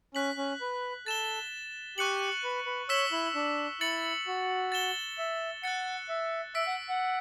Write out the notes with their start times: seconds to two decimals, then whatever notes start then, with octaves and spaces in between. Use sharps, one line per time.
0.15 C#4 F#6 B6 F#7
0.37 C#4
0.61 B4
1.06 A4 A6 E7 G7
1.97 G4 C#6 F#6 C#7 F#7
2.44 B4
2.66 B4
2.89 C#5 E6 B6 E7 G7
3.12 E4
3.35 D4
3.81 E4 A6 C#7 F#7
4.27 F#4
4.72 A6 E7 G7
5.18 E5
5.63 F#5 F#6 A6 C#7
6.09 E5
6.55 E5 E6 B6 D7
6.67 F#5
6.89 F#5